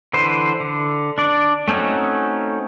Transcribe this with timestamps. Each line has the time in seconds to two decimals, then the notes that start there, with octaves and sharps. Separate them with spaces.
0.13 D3 E3 B4 C5
0.60 D3
1.18 D4 D5
1.68 A3 C4 C#4 D#4 F#4